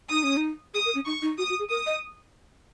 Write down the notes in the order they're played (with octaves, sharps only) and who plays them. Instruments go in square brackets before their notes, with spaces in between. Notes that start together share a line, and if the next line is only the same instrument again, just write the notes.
[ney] D#4 [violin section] D#6
[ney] C#4
D#4
[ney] G#4 [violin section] D#6
[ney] A#4
C#4
[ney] D#4 [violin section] C#6
[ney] D#4
[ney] F#4 [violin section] D#6
[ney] F#4
G#4
[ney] A#4 [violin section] D#6
[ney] D#5